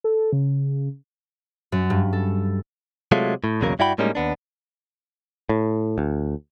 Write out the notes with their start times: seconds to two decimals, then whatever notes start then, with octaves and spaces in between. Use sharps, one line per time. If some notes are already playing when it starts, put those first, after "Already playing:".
0.04 A4
0.33 C#3
1.72 F#2
1.90 G2
2.13 A4
3.12 C3 F#3 G#3 A3 F4
3.44 A2
3.61 B1 E2 C#3 F#3 A#3 A#4
3.79 G2 E4 F#4 D5 G5 B5
3.98 A2 G3 G#3 A#3 C#4 D#4
4.15 D#2 B3 D4
5.49 A2
5.98 D2